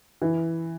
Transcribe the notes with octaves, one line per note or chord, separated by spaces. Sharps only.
E3